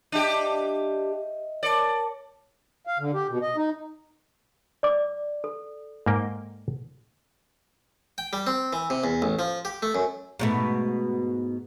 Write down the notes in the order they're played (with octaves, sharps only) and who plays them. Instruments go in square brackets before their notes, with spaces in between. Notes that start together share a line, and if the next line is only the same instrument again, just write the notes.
[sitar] D4 G4 [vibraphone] D#5 E5
[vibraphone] A#4 C#5 A5 [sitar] D5
[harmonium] F5
D3
G4
B2
D#5
D#4
[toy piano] D5 D6
A4
[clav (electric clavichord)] G#2 A#3 G5
[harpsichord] G5
G3
C4
E3
C3
E2
A1
F3
G4
A3
F#2
[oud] G#2 B2 A3